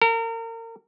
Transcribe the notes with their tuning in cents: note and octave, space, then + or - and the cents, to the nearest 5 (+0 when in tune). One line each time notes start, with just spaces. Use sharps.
A#4 -35